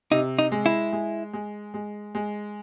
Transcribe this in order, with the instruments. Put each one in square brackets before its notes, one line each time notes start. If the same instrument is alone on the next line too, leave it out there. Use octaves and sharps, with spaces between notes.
[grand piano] C3 [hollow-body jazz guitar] D#4
[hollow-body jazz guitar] D#4
[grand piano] G#3
[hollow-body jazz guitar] E4
[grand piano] G#3
G#3
G#3
G#3